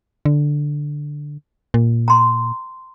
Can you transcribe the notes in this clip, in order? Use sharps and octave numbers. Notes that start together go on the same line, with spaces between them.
D3
A#2
A#5 C6